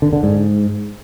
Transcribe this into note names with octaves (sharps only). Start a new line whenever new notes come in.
D3
D3
G#2